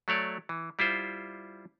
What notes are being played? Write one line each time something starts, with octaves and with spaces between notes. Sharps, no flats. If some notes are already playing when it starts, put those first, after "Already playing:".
F#3 A3 C#5 D5
E3
G3 E4 F4 C5